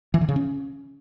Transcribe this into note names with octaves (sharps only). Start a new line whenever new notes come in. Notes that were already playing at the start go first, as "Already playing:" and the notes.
E3
D3
C#3
C#4